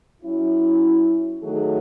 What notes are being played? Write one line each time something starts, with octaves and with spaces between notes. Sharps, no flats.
F#3 C#4 E4
D#3 F#3 A3 D#4 G#4